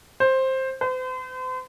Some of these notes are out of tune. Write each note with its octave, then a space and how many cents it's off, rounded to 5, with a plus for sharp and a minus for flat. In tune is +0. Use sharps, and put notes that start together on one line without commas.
C5 +10
C5 -40